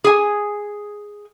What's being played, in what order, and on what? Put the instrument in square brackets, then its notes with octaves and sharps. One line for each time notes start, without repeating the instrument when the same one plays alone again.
[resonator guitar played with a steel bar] G#4 G#5